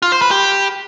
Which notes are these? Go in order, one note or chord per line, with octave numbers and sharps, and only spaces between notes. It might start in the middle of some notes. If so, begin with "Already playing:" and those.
F4
C5
B4
G4